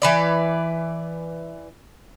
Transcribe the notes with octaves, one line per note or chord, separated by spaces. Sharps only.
E3 B4 D5